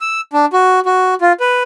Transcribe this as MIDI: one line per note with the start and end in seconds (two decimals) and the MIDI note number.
0.01 0.21 88
0.33 0.46 62
0.53 0.80 66
0.86 1.14 66
1.21 1.33 65
1.40 1.63 71